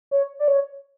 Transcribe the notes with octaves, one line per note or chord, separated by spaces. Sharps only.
C#5
D5
C#5